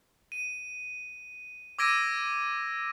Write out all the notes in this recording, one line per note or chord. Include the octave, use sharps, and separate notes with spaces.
D#7
D6 E6 G#6 A#6 D7 D#7